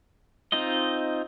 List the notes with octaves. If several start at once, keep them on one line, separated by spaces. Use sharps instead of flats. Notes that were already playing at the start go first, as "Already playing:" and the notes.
C4 D#4 F4 D#5